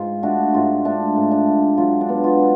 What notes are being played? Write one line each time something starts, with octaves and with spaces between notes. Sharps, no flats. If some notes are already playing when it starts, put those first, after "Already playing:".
Already playing: G#2 F4
A3 D4 F#4
G#2 F4
A3 D4
G#2
D4
G#2
F#3 F4
D4
B3
F4
D4